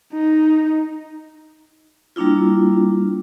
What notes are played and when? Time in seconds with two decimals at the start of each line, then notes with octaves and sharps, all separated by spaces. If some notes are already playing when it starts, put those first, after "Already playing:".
0.14 D#4
2.16 G3 A#3 D4 E4 F4